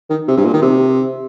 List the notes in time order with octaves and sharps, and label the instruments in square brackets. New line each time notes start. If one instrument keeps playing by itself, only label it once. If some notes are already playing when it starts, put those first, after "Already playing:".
[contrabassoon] D#3
C3
G2
A#2
D#3
C3